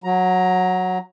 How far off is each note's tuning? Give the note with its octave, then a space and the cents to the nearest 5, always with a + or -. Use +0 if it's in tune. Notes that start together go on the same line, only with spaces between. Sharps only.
F#3 -10 A#5 +15